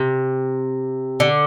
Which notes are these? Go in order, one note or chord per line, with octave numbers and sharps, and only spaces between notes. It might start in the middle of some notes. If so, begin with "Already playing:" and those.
Already playing: C3
D3